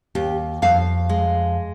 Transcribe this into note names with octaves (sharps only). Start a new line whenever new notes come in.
D#2 G4
F2 F5
G#3